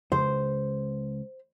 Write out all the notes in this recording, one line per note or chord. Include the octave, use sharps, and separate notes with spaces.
C#2 C5